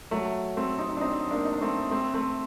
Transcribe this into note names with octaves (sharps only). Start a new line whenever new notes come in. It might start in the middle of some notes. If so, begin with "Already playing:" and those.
F#3 A3
A3 C4
C4 D#4
D4
C4 D#4
A#3 D4
D#4
D4
A3 C4
A3 C4
A3 C4